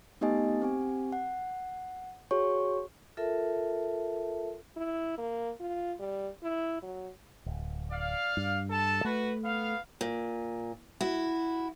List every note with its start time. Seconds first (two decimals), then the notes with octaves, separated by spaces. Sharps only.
0.21 A3 B3 D#4 G4 D#5 G#5
0.62 C4 G4 G#5
1.12 F#5
2.31 F#4 G#4 C#5 C#6
3.17 F4 A4 A#4 E5 A5
4.76 E4
5.18 A#3
5.60 F4
6.00 G3
6.43 E4
6.83 F#3
7.46 D1
7.92 D5 F5
8.37 G2
8.70 A4 A5
9.05 A3 F#4 B4
9.44 B3 F5
10.01 A#2
11.01 E4 F#4